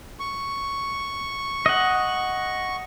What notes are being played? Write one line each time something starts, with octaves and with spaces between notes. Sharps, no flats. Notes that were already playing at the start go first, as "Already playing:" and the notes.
C#6
D#5 F#5